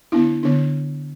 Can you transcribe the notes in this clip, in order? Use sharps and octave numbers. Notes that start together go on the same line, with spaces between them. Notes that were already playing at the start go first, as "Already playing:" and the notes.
D3 B3 D4 E4
D3 B3 D4